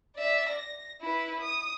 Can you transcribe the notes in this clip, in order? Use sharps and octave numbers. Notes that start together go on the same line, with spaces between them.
D5 E5
A#6
E4 B4
D#6